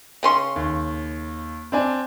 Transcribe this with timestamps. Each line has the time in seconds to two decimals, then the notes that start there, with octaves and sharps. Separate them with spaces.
0.23 C#3 C#4 C6
0.56 D#2
1.72 C4 D4 G#5